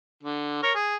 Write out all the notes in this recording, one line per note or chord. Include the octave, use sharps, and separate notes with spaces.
D3
A#4 C#5
G#4